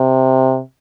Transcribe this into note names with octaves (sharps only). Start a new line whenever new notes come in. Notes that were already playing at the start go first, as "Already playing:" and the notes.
Already playing: C3